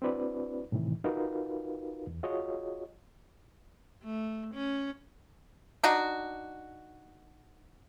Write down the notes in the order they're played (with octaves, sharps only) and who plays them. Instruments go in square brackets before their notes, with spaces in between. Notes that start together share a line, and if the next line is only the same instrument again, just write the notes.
[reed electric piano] C4 D4 E4 F#4 B4 D5
A2 C3 D#3 E3
D#4 F4 F#4 A#4 B4 F5
E2
F4 F#4 G#4 C#5 D#5
[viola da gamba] A3
C#4
[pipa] D4 D#4 F#4